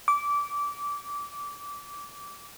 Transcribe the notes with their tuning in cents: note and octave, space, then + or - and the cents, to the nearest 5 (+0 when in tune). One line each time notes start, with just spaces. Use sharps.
D6 -20